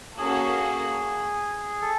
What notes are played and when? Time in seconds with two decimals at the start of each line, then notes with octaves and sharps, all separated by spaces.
0.18 A#3 C#4 F#4 G#4 A4
1.82 A4